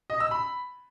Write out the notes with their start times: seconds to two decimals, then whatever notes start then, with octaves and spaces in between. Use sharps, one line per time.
0.10 D#5
0.20 E6
0.31 B5